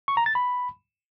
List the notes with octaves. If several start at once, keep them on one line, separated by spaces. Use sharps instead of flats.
C#6
A#5
A6
B5